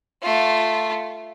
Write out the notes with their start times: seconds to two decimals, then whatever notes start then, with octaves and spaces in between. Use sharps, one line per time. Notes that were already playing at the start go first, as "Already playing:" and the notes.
0.23 A3 F4